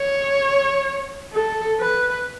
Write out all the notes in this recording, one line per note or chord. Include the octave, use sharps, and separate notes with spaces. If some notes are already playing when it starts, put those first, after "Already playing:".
Already playing: C#5
A4
B4